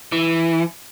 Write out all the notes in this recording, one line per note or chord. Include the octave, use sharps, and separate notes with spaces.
E3